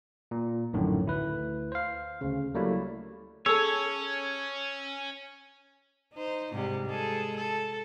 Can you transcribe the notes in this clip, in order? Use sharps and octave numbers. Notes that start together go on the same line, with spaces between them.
A#2
A#1 F#2 A2 D3 D#3
D2 E4 B4
C5 F5
D2 C#3
F#3 G3 A3 A#3 E4
C#4 G#4 A4 C#5 E6
D#4 C5
G#2 C3 G3
G#3 G#4 A4
A4